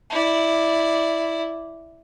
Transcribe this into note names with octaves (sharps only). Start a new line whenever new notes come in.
E4 D5